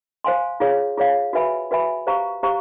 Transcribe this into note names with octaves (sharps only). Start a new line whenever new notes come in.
C5 F5 G#5 C6
F4 G#4 C#5 F5
F4 G#4 C#5 F5
F#4 B4 E5 G#5 B5
F#4 B4 E5 G#5 B5
G4 C5 F5 A#5 C#6
G4 C5 F5 A#5 C#6